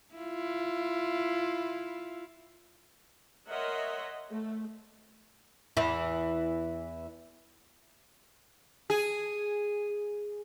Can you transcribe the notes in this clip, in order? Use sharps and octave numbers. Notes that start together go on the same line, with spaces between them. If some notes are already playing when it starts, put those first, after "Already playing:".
E4 F4
A#4 C#5 D#5 E5 F#5 C6
A3
E2 E3
G#4